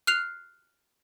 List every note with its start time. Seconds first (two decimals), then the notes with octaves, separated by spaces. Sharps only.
0.07 F6 F#6 C7 F7